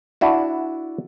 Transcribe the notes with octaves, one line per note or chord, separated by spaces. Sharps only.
D4 E4 F#4